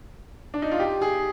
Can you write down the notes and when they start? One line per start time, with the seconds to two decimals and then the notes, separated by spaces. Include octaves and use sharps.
0.54 D4
0.62 D#4
0.72 F4
0.80 G4
1.02 G#4